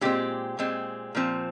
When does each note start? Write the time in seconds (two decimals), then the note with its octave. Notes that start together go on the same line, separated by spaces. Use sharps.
0.01 A#2 G#3 C4 G4
0.59 A#2 G#3 C4
1.15 A#2 F3 C4